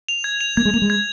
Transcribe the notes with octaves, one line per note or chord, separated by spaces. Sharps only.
F7
G#6
F7
A#3 G#6
G#3
A#3 F7
G#3
G#6